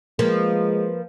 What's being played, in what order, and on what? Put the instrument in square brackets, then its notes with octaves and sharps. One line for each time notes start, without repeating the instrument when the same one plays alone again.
[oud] F3 A#3 [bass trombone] G#3 [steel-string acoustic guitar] B4